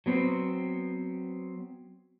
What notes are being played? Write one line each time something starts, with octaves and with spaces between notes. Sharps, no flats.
F#3 B3 C4